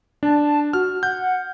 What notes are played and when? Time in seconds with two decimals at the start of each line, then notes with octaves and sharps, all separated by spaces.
0.23 D4 A5
0.73 F#4 F6
1.03 F#5 G6